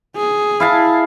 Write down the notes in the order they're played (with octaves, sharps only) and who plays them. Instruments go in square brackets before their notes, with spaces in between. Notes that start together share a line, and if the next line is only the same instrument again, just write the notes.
[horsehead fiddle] G#4
[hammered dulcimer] E4 F5 A5